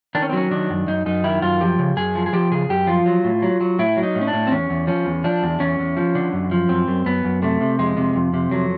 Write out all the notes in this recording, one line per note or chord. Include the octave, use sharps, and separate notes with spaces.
D#3 D4
C#4
C4
F#3 C#4
D#3 D4
F#2
F#2 D#4
F#2 D#4
D#3 E4
F#2 F4
F3 G4
C#3
F#2 G#4
F3
G#4
F3 G4
C#3 G#4
F#2 G4
F3 F4
F#3
A2
F#3
F#3
A2 E4
F#3
D#4
A2
C#4
D4
A2
C4
E2 C#4
E2
F3 C#4
E2
F3 D4
E2
E2 C#4
E2
F3
D3
F#2
F3
F#2 C4
F#2
F#2 B3
F#2
C3 A3
C3
F2 G#3
C3
F2
C3
F2 F#3